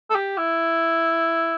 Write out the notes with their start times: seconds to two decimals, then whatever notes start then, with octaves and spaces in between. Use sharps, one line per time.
0.10 A4
0.15 G4
0.37 E4